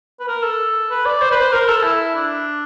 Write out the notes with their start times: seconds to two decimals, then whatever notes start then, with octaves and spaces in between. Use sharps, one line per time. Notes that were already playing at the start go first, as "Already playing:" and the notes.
0.20 B4
0.28 A#4
0.43 A4
0.91 B4
1.06 D5
1.21 C5
1.31 B4
1.41 C5
1.52 A#4
1.69 A4
1.83 E4
2.16 D4